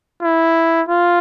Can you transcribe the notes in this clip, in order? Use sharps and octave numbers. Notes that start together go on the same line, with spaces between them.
E4
F4